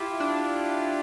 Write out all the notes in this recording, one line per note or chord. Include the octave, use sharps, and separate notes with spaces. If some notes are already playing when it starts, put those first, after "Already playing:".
Already playing: E4 F4 G4
D4